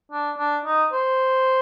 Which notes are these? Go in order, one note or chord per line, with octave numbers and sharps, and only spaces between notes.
D4
D4
D#4
C5